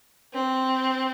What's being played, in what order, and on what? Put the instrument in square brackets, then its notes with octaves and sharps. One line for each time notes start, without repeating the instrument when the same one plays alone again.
[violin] C4